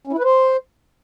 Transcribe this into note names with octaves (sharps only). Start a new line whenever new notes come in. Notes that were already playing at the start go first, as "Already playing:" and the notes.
C#4
E4
B4
C5